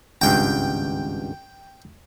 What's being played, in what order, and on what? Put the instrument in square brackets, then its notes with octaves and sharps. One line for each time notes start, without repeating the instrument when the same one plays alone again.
[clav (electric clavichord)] G#1 C#2 G2 [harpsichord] G5